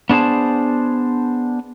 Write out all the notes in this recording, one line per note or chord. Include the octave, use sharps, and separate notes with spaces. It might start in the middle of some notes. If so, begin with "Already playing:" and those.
B3 D4 G#4 C5 A5